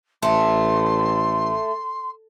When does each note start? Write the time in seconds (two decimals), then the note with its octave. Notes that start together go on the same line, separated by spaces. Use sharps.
0.22 A1 A3 C6